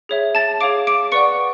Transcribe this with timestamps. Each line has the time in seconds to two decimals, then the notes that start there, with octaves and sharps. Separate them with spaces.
0.09 G#4 C#5 E5
0.35 A5 A6
0.61 G#4 C#5 F5 D6 D7
0.87 D6 D7
1.12 B4 D5 F#5 C#6 C#7